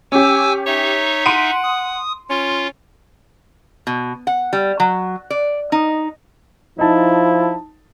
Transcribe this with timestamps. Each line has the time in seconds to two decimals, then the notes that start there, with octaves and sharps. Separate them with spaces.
0.12 C#4 G4 G#5 D6 E6
0.66 D#4 C#5 E5
1.26 F#5 C6 D7 D#7
1.63 D#6
2.30 C#4 F4
3.87 B2
4.27 F#5
4.53 G3
4.80 F#3
5.30 D5
5.72 D#4
6.79 F3 D#4 E4 A5